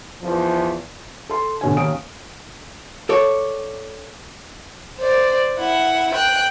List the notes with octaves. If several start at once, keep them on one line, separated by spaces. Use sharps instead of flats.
E2 F3
A4 C6
B2 D3 C#4 G#5
D#2 D#3 C#4 F5 D#6 D7
A4 C#5 D5
C5 D5
E4 F#5
G5 F#6